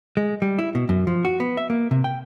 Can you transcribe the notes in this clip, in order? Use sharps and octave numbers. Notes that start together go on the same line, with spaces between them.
G#3
G3
E4
B2
F#2
F3
F#4
B3
E5
A#3
C3
G5